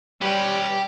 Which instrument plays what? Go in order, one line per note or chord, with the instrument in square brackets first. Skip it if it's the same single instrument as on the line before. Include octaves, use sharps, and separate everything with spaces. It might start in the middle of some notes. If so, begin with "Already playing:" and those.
[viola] G3 [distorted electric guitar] C#4 B4 [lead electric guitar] G4 G5